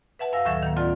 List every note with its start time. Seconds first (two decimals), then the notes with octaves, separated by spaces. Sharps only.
0.19 B4 E5 F#5 A5
0.33 F#2 F5 G#5 E6 A#6
0.45 D2 A2 D#3 F#3 E5 G#6
0.62 D#3 A#3
0.76 D2 C4 F4 D5 A5 A6